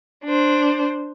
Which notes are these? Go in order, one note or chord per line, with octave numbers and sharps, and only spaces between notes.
D4 C5